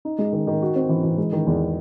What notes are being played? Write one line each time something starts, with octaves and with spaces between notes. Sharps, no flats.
D#4
G#3
D#3
D#3
F#4
C4
E3
E3
G#3
D#3
E2